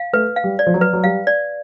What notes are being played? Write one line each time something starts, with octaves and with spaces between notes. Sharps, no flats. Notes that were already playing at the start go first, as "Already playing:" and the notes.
Already playing: F5
A3 B4
F5
G3
D5
F3
F#3
B4
F#3
G3 F5
D5